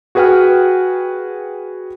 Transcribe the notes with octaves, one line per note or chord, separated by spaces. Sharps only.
F#4 G#4 B4 F#5 G5 F6